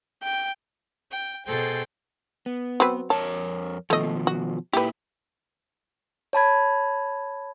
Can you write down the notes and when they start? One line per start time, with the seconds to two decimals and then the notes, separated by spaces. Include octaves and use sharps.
0.23 G5
1.11 G5
1.47 B2 G#4 A4 C5 G5 A6
2.46 B3
2.80 F#3 C4 B4
3.10 F2 A#4 C#5 A5
3.90 B2 D#3 F3 A3 D#5
4.27 F#4
4.73 A#2 E4 G4 B4
6.33 C#5 A5 B5 G#6